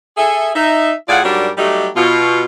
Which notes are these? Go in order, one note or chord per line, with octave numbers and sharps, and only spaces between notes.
G#4 A4 E5
D#4 E5
A2 F4 G#4 D5 F5 F#5
G#2 F#3 G3 D4 A#4
F#3 G3 A3 D#4 G4
B2 F4